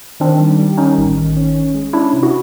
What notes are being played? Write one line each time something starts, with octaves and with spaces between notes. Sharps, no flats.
D#3 C4 D4
G3
G3
D#3 C#4 D#4
A1
D#3
C#4
C#4
G#3
C#4 D4 E4
C3
E4 F#4